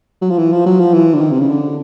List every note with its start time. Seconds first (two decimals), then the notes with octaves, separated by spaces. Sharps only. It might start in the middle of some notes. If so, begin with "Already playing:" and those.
0.22 F#3
0.30 F3
0.38 E3
0.52 F3
0.66 F#3
0.80 F3
0.94 E3
1.14 D3
1.21 D#3
1.32 C3
1.40 C#3
1.49 D3